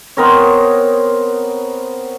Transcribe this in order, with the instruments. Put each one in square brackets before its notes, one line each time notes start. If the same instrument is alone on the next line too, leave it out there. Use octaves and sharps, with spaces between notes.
[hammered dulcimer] B3 C4 A#4 C#5